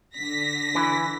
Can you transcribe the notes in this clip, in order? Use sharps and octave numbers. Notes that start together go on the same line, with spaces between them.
D3 A#6 B6
E3